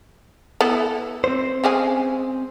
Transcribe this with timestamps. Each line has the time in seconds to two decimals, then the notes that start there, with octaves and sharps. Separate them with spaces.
0.61 B3 E4 A4
1.24 C4 C5
1.64 C#3 G#3 G#5